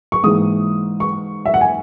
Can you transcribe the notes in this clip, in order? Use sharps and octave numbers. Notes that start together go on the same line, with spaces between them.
C#6
G#2 E3 A#3 D#6
C#6
E5
F#5
G#5